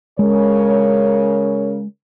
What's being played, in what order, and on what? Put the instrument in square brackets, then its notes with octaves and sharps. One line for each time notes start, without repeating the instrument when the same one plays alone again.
[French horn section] C#3 A#4 C#5 [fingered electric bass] G#3